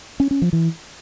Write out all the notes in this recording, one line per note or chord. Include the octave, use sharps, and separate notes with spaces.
C#4
C#4
F3
E3